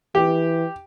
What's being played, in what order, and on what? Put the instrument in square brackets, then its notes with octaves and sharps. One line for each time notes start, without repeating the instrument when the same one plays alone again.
[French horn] E3 [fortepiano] G4